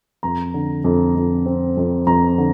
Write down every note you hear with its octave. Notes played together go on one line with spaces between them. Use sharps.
F2 A#5
D3
F2
F2
C4
F2
F2 A#5
D3